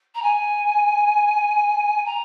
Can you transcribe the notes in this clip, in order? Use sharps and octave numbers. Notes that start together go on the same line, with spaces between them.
A#5
G#5
A#5